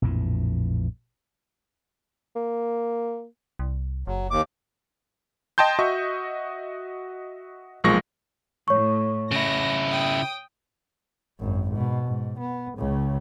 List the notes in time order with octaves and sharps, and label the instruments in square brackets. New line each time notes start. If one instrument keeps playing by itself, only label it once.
[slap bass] A#1 F2 A2 E3
[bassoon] A#3
[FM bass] C2
[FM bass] F#1 [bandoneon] F#3
[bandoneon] D#2 D6
[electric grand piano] D#5 G5 A5 C6 G6
F#4 D#5 E5 C#6
B1 A#2 F3 G#3 C#6 A#6
[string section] A2 [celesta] C#5 C#6
[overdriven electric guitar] C#3 E4 [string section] A#6
[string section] G5 D#6
[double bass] G#1 F#2
G#2 B2
G#2
B3
C#2 C#3